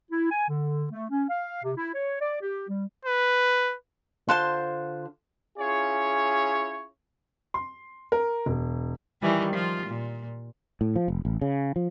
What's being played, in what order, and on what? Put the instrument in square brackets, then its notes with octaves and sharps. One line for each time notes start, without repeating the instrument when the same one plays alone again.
[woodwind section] E4
G#5
D3
A3
C#4
F5
C3
E4
C#5
D5
G4
G3
[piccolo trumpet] B4
[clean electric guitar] D3 F4 F#5 [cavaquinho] C5 A5 C6
[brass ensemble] C#4 E4 F4 G#4 C#5
[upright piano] C6
A#4
E1
[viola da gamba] D#3 E3 G3
F3 F4
A#2
[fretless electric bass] A2
F3
F1
A1
C#3
F3